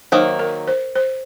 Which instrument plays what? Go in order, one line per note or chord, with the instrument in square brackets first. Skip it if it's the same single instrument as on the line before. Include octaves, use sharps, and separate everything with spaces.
[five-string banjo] D#3 F#3 A#3 [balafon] C5
[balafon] A#4
C5
C5